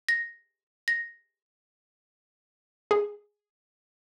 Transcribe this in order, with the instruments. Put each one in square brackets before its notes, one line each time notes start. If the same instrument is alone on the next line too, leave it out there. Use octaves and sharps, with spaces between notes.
[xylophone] A#6
A#6
[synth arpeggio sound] G#4